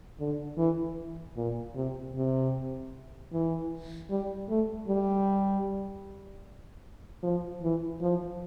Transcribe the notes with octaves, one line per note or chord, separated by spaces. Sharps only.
D3
E3
A#2
C3
C3
E3
G3
A3
G3
F3
E3
F3